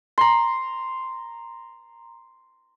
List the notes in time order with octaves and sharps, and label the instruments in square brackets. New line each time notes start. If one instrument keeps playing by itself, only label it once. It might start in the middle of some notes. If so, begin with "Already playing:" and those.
[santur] A#5 C6